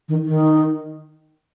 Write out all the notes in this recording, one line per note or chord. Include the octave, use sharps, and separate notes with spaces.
D#3
D#3